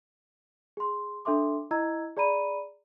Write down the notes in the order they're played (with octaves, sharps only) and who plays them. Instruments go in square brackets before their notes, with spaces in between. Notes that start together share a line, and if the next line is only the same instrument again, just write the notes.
[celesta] G#4 C6
D4 A4 E5 C6 D6
E4 D#5 A#5 E6 G#6
G#4 D5 A#5 B5 D#7